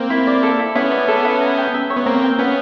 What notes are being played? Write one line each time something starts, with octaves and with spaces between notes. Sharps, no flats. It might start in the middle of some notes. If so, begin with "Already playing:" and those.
Already playing: A#3 C4
E4
D5
A4
E4
B3 C#4 E4
D5
A4
E4
A#5
G5
E5
C#5
B3
A#3 C4 A#5
G5
B3 C#4 E5